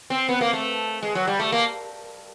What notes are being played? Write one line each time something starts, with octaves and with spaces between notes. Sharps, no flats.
C4
B3
A#3
A3
G#3
F#3
G3
A3
A#3